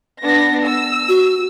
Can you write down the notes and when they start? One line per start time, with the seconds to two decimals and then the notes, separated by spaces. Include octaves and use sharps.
0.23 B3 D4 A#6
0.63 E6
1.09 F#4